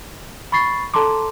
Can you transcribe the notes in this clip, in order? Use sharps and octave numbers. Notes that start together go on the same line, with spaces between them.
B5 C#6 A6 C7
A4 A5 A#5 C6 D6